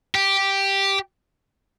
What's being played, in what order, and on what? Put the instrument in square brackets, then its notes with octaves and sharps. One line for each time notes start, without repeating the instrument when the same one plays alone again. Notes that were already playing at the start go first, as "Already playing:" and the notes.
[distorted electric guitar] G4